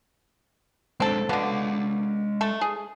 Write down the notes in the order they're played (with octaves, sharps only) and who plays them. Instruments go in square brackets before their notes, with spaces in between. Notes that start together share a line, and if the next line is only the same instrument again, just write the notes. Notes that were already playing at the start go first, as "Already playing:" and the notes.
[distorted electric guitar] G#3 D4 [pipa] C4 A4
[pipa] B2 D3 [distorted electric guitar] G#3 F5
[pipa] A3 A4
G#4